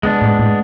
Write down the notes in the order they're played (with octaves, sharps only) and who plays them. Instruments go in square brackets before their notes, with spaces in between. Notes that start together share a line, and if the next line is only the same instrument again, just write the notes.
[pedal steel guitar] G#3 B3 D4
[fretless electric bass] A2
A2